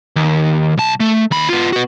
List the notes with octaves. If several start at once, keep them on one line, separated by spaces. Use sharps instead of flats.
D#2
B1 A5
A3
D#2 B5
B3 F4
B3 F#4